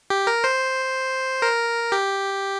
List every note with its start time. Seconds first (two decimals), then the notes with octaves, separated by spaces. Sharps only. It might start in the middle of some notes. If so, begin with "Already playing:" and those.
0.10 G4
0.27 A#4
0.44 C5
1.42 A#4
1.92 G4